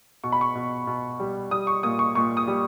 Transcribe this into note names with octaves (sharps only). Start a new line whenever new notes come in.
B2 C#6
B5
C#6
B2
B2
G3
G3 D#6
C#6
A#2 D#6
C#6
A#2 C#6
D#6
G3